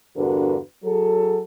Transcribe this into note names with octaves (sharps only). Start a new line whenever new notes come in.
E2 G2 D3 F#4 A#4 B4
F#3 G#4 A4